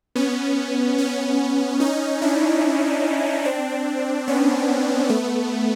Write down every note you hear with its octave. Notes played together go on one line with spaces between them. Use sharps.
B3 C#4
B3 C#4
C#4 D#4
D4 E4
C4 D4
B3 C#4
A3 B3